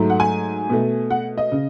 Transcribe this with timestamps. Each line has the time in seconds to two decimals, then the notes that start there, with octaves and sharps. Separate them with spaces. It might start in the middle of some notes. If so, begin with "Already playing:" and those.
Already playing: G#2 F#3 A3
0.10 F#5
0.20 G#5
0.70 B2 A3
1.11 F#5
1.38 D#5
1.52 C#3